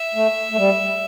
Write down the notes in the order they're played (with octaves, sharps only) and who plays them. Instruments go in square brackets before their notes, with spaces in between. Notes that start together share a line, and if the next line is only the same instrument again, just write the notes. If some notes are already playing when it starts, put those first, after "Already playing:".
Already playing: [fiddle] E5
[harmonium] A3
A3
G3